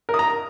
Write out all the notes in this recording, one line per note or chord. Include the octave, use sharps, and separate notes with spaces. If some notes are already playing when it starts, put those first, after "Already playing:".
A#4
D#6
A#5